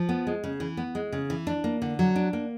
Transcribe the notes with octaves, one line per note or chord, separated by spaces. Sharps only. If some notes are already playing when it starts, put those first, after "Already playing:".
Already playing: F3
B3
G#3
C#3
E3
B3
G#3
C#3
E3
D4
A#3
D3
F#3
D4
A#3